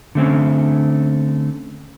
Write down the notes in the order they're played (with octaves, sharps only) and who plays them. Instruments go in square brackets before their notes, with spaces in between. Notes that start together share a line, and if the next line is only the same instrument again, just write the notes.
[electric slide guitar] D3 A3 C4 C#4